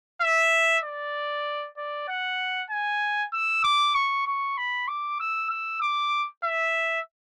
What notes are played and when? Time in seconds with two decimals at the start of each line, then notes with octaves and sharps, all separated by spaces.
0.21 E5
0.84 D5
1.77 D5
2.09 F#5
2.70 G#5
3.33 E6
3.64 D6
3.95 C#6
4.27 C#6
4.57 B5
4.88 D6
5.20 E6
5.50 E6
5.81 D6
6.44 E5